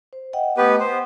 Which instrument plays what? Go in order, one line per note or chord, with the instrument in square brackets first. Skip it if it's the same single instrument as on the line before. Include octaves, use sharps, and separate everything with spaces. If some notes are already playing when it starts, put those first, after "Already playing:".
[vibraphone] C5
D#5 F#5 G5
[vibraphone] A3 D#5 [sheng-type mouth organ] B3 G4 B4
[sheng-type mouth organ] C5 [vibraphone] F#5